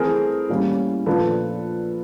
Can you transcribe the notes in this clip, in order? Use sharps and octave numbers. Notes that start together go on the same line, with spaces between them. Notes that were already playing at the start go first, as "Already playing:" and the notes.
Already playing: E3 A3 C4 G#4 A#4
A2 E3 G3 A#3 C#4
A#2 F3 A3 D4 A4 B4